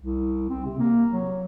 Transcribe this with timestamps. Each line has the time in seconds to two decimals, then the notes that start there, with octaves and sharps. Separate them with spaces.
0.01 C2
0.49 C4
0.65 C3
0.79 A#3
1.10 F#3